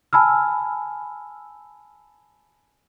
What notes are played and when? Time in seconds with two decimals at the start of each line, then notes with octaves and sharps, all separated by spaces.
0.13 G#5 A5 B5 E6 F6